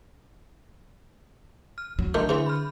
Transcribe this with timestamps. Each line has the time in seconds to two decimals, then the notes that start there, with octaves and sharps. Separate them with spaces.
1.78 F6
1.99 F#3
2.14 D3 D#3 F#3 A3 C6 G6
2.29 C3 E3 G#4 C6
2.46 B5 F6